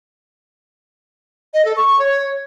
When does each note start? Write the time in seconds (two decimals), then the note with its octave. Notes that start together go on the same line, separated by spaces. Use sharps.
1.54 D#5
1.65 A4
1.76 C#6
1.88 C#6
1.99 C#5